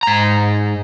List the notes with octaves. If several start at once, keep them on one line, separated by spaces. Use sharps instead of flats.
G#2 A#5